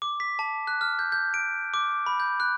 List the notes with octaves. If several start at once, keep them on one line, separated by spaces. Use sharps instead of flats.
D6
B6
A5
F#6
F6
G6
G6
D7
D6
B5
G6
F#6